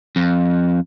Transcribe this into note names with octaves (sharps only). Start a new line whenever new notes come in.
F2